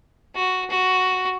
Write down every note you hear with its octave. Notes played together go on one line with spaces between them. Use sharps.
F#4
F#4